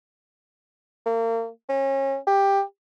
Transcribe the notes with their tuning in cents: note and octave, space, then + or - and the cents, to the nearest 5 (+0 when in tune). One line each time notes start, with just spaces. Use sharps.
A#3 -35
C#4 -30
G4 +10